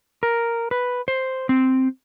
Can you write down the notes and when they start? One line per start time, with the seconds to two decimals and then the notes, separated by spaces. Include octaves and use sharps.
0.23 A#4
0.71 B4
1.08 C5
1.49 C4